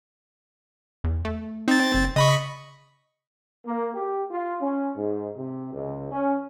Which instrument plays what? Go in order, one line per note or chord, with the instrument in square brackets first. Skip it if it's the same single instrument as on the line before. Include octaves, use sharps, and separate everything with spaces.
[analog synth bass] E2
A3
[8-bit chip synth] C4 A6 [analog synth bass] D#4
[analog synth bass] F#1
[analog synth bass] C#3 [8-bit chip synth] D#5 B5 C#6
[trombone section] A#3
G4
F4
C#4
G#2
C3
C#2
C#4